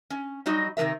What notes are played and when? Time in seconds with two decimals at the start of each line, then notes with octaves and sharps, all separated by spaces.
0.10 C#4
0.46 F#3 G3 D#4 F#4 D#5
0.77 C3 D#3 F3 A#4 E5